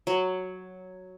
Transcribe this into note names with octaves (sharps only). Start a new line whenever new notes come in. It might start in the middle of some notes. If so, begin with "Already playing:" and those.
F#3